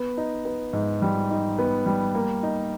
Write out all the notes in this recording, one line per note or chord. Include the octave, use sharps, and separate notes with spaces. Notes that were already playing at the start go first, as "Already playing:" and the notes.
Already playing: B3
D#4
B3
G#2
G3
D#4
B3
G3
A#3
D#4